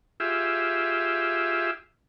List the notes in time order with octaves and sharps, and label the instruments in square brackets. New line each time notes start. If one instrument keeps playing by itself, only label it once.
[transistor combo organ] F4 G4 G#4 E5